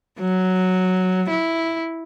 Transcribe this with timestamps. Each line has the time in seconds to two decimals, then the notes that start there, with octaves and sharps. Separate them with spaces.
0.20 F#3
1.30 E4